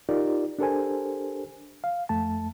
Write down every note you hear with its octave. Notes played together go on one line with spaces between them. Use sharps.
D#4 F4 G4 A#4 D5
D4 G4 A4 A#4 C5 G#5
F5
F2 A3 A5